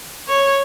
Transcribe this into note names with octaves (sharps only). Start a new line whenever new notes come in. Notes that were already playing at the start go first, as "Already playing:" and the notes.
C#5